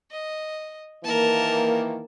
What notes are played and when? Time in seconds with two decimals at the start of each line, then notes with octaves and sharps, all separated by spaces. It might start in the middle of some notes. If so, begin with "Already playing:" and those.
0.11 D#5
1.04 D#3 E3 A#3 A#4 A5